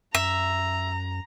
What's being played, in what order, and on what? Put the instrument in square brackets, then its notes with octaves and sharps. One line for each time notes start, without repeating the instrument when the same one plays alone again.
[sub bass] F#2 [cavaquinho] E5 [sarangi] A#5